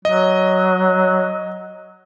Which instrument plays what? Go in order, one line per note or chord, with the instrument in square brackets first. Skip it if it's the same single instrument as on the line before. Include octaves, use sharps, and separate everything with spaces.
[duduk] F#3 [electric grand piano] D#5